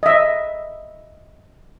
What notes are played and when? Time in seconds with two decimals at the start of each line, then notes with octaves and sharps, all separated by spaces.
0.03 D#5 E5